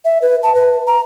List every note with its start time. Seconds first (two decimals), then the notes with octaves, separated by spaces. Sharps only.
0.05 E5
0.22 B4
0.43 A5
0.55 B4
0.87 A#5